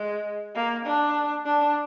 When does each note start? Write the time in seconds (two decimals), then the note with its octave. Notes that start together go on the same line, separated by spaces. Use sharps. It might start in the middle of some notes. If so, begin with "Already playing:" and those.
Already playing: G#3
0.55 A#3
0.85 D4
1.45 D4